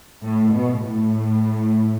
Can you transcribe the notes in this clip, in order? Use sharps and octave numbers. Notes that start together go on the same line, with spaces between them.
A2
B2
A2